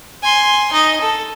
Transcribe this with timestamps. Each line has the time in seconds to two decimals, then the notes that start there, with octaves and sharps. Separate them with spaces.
0.23 G#5 C6
0.72 D#4 D#5
1.01 A4